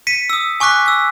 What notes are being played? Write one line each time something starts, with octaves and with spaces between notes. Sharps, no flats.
B6 C#7 D#7
D#6 E6
G#5 C#6 D6 F#6 B6
E6 B6